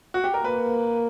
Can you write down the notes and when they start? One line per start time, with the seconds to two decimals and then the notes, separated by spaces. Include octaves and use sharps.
0.14 F#4
0.24 G4
0.34 A#4
0.44 A#3 B4